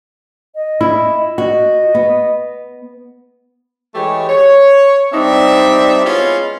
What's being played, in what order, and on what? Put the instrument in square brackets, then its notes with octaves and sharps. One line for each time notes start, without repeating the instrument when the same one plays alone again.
[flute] D#5
[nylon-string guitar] E4
[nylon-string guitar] F#4 [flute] D#5
[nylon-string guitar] B3
[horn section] E3 G#3 A3 G4 C#5
C#5
G3 C4 D4 D#4 E5
G#3 B3 C#4 E4 F4